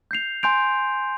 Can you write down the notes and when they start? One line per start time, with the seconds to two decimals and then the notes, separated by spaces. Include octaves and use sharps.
0.11 G6 C7 F7
0.43 G#5 C6 G6 D7 F7